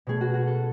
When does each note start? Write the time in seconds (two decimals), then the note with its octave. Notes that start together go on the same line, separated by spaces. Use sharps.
0.07 B2 A3 C#4 G#4
0.21 F#4
0.34 F#4
0.47 A4